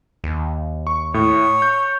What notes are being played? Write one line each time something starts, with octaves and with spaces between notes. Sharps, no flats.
D#2
C#6
A2 C#5
G6